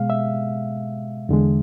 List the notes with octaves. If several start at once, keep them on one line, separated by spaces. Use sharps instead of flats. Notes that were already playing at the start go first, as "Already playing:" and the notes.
Already playing: B2 G#3 F5
E5
E2 D3 G#3